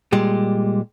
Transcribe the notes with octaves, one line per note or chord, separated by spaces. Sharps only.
A#2 G3 G#3